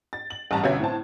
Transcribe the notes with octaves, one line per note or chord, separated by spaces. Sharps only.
A6
F#7
A1 G2 A5 A#5
G1 B2 C#4 E5 G#6
A2 C4 A5